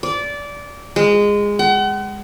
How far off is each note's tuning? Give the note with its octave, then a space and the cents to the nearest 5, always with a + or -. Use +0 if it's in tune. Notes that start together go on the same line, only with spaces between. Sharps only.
D5 -20
G#3 -15
F#5 +40